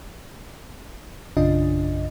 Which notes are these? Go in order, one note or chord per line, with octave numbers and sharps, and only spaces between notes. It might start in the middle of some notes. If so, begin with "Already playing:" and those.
A#1 F#2 C#3 D4 F4 D#5